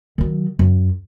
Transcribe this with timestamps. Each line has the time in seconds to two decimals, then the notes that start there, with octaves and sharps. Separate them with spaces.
0.18 D#3 F#3
0.59 F#2